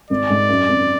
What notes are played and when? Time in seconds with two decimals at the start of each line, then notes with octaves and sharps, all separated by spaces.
0.10 G#1 D5
0.30 G#2
0.49 F#2
0.69 G#1